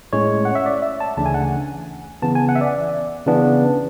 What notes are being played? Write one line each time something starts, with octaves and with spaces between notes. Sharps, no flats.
A2 G#3 C#4 C#5
F#5
E5
D5
E5
A5
D2 C#3 E3 A3 D4 A5
G#5
F#5
G#5
C#3 E3 B3 A5
G#5
F#5
E5
D5
C#3 E3 B3 D4